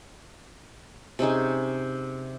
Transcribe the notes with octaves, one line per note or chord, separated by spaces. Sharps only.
C3 C#4 D#4 G#4